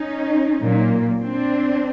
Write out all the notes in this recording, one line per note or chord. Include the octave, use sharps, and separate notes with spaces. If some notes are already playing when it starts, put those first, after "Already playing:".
Already playing: C#4 D#4
A#2 F#3 A#3
C4 D4